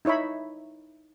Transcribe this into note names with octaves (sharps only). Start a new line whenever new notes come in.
D#4 E4 C#5 E5 B5